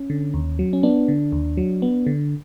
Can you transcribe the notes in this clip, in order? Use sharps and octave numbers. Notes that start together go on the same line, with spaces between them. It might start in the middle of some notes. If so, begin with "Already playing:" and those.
Already playing: C#4
D3
D#2
F#3
C#4
B3 D4
D3
D#2
F#3
B3
D3